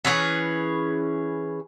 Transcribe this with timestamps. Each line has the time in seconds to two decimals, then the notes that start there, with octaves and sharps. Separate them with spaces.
0.05 E3 C#4 G#4 B4